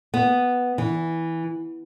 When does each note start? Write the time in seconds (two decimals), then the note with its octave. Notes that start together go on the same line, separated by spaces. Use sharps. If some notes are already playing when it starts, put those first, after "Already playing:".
0.14 B3
0.78 E3